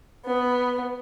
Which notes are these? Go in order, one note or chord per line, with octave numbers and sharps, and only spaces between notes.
B3